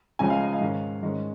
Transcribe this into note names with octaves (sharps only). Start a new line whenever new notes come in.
C#2 C#3 F3 G#3 C#4 G#5
F5
D#5
F5
G#2 D#3 C#4
G#2 D#3 G#3 C#4